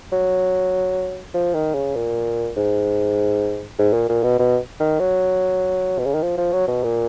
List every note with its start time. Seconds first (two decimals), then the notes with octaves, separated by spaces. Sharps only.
0.13 F#3
1.34 F3
1.54 D#3
1.74 C#3
1.95 A#2
2.57 G#2
3.79 G#2
3.93 A#2
4.09 A#2
4.23 B2
4.39 B2
4.80 D#3
5.00 F#3
5.98 B2
6.06 C#3
6.14 D#3
6.23 F3
6.38 F3
6.53 F#3
6.68 B2
6.84 A#2